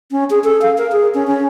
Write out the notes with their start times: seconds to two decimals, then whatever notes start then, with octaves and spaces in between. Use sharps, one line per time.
0.11 C#4
0.30 G#4
0.44 A4
0.62 F5
0.78 A#4
0.92 G#4
1.14 C#4
1.27 C#4